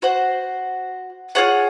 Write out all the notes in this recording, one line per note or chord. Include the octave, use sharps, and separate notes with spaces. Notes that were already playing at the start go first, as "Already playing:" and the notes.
F#4 C5 F#5
F4 G#4 C#5 F#5